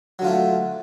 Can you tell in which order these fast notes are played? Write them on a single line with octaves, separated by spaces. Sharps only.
F#3 D3 F4 A3